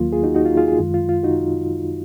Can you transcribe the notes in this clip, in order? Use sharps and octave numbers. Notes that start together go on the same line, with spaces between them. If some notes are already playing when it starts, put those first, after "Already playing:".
Already playing: D#2 D#3 F#3 A#3 F4
F4 G#4
D#4 F#4
D#4 F#4
F4
F4 G#4
F4 G#4
F#2 D#3 G#3 F4
F4
F4
D#4 F#4